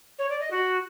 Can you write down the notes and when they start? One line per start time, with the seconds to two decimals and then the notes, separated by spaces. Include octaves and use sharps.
0.19 C#5
0.29 D5
0.40 D#5
0.51 F#4